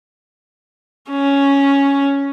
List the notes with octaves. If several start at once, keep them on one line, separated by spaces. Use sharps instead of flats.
C#4